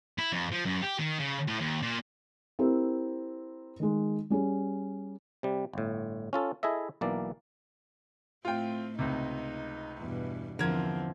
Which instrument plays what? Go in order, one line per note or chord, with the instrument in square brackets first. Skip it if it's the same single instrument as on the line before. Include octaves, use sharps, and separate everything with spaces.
[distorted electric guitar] E4
F2
F3
F#2
G4
D#3
C#3
A2
D#2
A#2
[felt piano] C4 E4 G4 A#4
D#3 G#3
G3 C#4 G#4
[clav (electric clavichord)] C3 G3
G1 A2
C#4 F4 A4
E4 G#4 A4 D#5 E5
B1 E3 A#3 D5
[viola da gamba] A2 A3 C4 [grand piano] F4 G5
[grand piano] C#2 C3 [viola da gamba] D#4
[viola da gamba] E2 G2 B2
[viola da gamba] E2 C4 [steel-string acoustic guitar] D3 F3 [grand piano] A#4 G#6